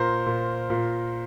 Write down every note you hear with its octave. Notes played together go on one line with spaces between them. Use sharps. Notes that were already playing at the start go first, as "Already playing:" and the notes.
Already playing: A#2 A#4 C5
A#2
A#2